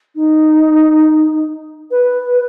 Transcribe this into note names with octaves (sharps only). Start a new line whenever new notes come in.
D#4
B4